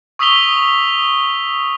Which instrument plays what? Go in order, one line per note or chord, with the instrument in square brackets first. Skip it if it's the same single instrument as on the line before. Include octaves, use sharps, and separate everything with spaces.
[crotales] C#6 D#6 E6 B6 F7 G7